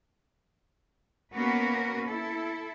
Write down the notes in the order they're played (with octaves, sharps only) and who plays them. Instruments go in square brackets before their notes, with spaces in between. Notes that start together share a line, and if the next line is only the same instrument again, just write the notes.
[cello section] A#3 B3 C#4 F#4 A#4 B4
E4 A4